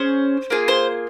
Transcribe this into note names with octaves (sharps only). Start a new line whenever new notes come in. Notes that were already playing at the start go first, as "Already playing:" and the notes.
Already playing: C#4 G#4 C5
A#3 F4 G#4
C5